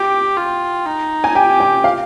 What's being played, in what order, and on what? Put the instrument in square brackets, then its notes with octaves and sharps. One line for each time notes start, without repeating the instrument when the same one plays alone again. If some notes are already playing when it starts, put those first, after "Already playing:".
Already playing: [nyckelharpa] G4 [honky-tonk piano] G5
[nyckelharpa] F4
D#4
[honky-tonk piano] G#5
[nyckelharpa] G4 [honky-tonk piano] G5
[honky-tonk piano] G5
F5